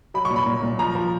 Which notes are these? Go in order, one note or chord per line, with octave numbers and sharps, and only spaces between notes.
F#3 B5
C#6
A#2
B5
A#2
A#2
F3 A#5
F3